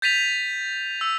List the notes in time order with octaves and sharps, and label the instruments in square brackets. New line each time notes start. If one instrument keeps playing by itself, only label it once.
[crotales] G6 A6 B6 D#7 F7
E6